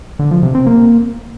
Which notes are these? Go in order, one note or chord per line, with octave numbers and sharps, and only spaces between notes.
D3
F3
C3
C4
A#3